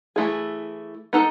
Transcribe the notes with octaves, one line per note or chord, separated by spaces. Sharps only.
E3 A3 E4 G#4
B3 D#4 A4